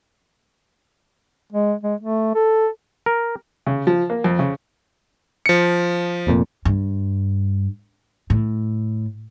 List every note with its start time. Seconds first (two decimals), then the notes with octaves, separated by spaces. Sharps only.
1.52 G#3
1.83 G#3
2.00 A3
2.35 A4
3.06 A#4
3.67 C#3
3.87 F3
4.10 A#3
4.24 F2
4.39 C#3
5.46 F3 C#7
6.27 F1 F2 A#2
6.65 G2
8.30 A2